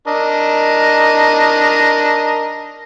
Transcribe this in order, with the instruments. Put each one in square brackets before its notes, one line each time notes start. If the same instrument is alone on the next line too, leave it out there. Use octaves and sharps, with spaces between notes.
[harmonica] D4 A#4 D#5